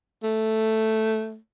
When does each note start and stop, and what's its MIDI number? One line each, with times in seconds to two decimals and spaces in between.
0.23 1.37 57